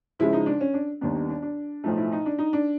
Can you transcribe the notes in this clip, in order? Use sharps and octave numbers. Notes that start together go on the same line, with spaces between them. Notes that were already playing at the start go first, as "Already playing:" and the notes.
C#2 C#3 F3 G#3 E4
D#4
D4
C#4
D4
D#2 D#3 G3 B3 D4
D4
D4
D4
B1 A2 F3 A3 D#4
E4
D#4
D4
D#4
D4